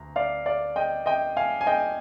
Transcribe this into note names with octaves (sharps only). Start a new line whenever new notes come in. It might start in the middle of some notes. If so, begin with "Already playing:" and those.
Already playing: D2 A#5
D5 F5
D5 F5
D#5 G5
D#5 G5
F5 G#5
G#5
D#5 G5